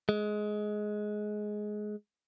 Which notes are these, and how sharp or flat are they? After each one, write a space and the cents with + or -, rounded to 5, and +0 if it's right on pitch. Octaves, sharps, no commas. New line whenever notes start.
G#3 +15